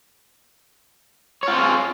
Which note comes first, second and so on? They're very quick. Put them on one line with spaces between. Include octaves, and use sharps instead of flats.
C#5 F4 C4 G#4